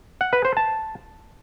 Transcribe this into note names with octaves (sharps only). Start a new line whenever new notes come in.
F#5
B4
C5
A5